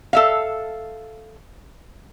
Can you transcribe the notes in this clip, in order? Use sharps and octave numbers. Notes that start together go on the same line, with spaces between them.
A4 E5 F5